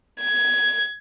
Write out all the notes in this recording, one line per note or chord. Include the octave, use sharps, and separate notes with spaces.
G#6